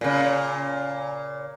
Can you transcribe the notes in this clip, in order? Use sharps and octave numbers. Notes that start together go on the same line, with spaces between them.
A#2 C#3